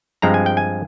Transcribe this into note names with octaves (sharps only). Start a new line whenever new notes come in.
G2 F3 G#3 C4 A#5
G#5
G5
G#5